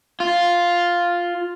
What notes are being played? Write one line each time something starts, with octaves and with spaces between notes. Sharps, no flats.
F4